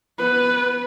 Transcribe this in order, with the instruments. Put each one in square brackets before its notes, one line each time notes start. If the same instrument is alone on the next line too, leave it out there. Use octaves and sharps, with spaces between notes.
[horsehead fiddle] B3 B4